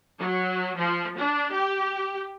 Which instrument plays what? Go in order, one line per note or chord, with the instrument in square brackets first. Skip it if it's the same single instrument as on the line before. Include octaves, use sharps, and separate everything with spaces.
[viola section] F#3
F3
D4
G4